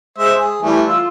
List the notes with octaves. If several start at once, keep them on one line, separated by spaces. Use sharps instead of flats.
G#3 C5 E5
G#4
E3 G3 A3
F4 E6